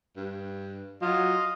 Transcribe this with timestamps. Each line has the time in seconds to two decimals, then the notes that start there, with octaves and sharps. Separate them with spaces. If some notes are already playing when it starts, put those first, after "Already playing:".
0.17 G2
1.02 F#3 F4 D#5 F5